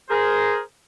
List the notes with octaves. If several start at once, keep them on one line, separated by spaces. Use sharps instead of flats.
G#4 A#4 C5